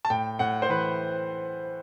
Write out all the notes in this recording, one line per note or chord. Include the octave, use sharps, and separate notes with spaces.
A5
A2 G5
A2 F#5
C5
E3 B4